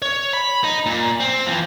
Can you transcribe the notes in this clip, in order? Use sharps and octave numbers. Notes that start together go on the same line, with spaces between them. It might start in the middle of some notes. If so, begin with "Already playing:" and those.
C#5
B5
D#4
A#2
C4
E3 F3